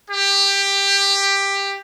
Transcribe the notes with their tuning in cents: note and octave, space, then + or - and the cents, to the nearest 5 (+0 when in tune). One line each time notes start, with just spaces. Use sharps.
G4 +15